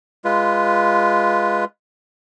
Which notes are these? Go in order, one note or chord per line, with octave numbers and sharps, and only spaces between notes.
G#3 F4 B4